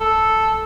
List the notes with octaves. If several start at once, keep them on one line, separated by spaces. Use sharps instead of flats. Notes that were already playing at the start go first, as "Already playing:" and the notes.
A4